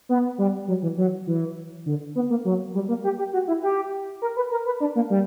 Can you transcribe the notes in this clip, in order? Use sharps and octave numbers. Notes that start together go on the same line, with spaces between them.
B3
G3
F#3
E3
F#3
E3
D3
B3
A#3
F#3
G3
A#3
G4
G4
F#4
E4
G4
A#4
B4
A#4
B4
D4
A#3
G3